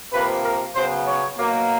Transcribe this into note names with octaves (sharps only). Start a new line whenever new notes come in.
C3 F3 A#3 B4
A#4
C#3 F#3 B3 C5
C#5
B2 F#3 A#3